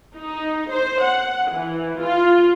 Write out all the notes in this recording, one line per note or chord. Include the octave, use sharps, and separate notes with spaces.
D#4
C5
F#5
E3
F4